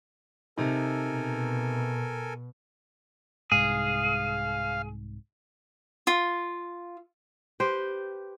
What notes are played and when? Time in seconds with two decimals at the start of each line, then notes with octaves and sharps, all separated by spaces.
0.58 C3 D#4 A4 A#4 G#5
1.09 B2
3.52 C2 G#2 G#4 F5
6.07 F4
7.60 G4 B4 C5